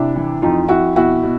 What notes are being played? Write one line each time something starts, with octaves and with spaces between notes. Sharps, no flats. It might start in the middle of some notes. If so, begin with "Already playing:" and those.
Already playing: C3 D4 E4
E3
F2 D#4 F4
F2 E4 F#4
B2 E4 F#4
B2